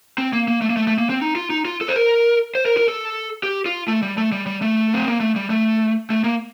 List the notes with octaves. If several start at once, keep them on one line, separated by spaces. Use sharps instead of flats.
C4
A#3
A#3
A3
A#3
A3
A3
A#3
C4
D#4
F4
D#4
F4
A4
C5
A#4
C5
A#4
A#4
A4
G4
F4
A3
G3
A3
G3
G3
A3
C4
A#3
A3
G3
A3
A3
A#3